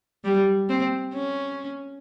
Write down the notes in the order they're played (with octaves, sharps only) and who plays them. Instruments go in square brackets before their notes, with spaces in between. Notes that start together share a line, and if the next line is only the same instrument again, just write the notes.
[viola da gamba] G3
C4
C#4